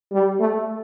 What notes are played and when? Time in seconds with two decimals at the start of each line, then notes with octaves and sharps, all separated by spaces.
0.12 G3
0.40 A3